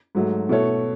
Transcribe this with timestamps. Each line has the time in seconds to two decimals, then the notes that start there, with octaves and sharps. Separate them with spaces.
0.15 G#2 F#3 A3
0.49 B2 A3 E4 A4 C#5